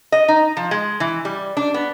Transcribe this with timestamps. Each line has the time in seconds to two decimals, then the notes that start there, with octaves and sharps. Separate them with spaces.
0.12 D#5
0.28 D#4
0.57 F3
0.71 G#3
1.00 E3
1.25 G3
1.57 D4
1.74 B3